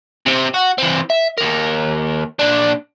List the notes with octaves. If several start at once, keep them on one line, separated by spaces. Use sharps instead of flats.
C3 C4
F#4
E3 C4
E5
D#2 A#4
A#2 D4